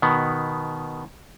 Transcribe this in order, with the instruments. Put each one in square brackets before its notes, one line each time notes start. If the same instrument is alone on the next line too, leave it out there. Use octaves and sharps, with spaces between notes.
[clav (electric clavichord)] B2 D#3 B3